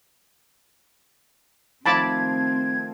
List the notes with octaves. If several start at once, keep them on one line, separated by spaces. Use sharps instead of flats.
D#3 F3 A3 C4 A5 B5 D6 G#6